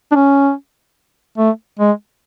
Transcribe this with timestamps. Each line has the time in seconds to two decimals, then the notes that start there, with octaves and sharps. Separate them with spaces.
0.11 D4
0.15 C#4
1.38 A3
1.79 G#3